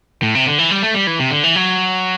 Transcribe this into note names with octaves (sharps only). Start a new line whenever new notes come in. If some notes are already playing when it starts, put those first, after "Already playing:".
A2
C3
D3
E3
G3
A3
G3
E3
C3
D3
E3
F#3